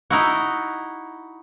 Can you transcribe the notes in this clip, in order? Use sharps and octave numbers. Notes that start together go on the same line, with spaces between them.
D#4 E4 F#4